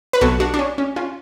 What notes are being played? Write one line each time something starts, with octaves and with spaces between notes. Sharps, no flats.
B4
B1 B2 F#3 F#4 A4
D4 F#4
D4
C#4
C#4
C#4 F4